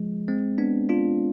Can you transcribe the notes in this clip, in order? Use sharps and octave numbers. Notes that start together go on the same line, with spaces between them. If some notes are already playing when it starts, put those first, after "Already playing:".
Already playing: F3 G#3
G#3 C4
B3 D4
D4 F4